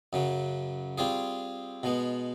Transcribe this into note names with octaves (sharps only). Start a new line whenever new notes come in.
F#2 C#3 F#3
G3 C4 F4 G#4
B2 G#3 B3